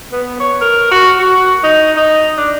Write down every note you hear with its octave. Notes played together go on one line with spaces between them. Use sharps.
B3
C#5
A#4
F#4
F#4
D#4
D#4
D4